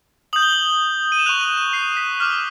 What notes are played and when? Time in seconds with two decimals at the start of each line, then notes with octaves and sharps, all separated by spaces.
0.33 D#6 G6 F#7
0.42 G7
0.52 F#7
1.12 D#7
1.19 E7
1.26 C#6 F#6 F7
1.41 F7
1.57 E7
1.73 C7
1.97 B6
2.20 D6 F6 B6